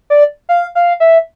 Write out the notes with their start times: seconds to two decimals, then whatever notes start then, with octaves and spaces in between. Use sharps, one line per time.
0.10 D5
0.49 F5
0.75 F5
1.00 E5